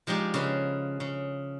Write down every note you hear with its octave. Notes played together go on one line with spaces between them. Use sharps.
F3 G#3 D#4 G4 D5
C#3 G#3 B4
C#3